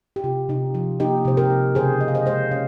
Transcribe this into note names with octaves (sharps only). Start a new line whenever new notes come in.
G4
C3 F4
C3 D#4
F3 F4
A#3 D#4 G4
C3 C5
G4 A#4
C3
C#3 G#4 C5
C#3 D#5
F5
C5 D#5
G#3 C5 D#5
C#4 C#5 F5